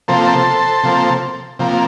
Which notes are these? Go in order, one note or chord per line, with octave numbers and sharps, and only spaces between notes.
C3 F3 A#3 A4 C5
C3 F3 A#3
C3 F3 A#3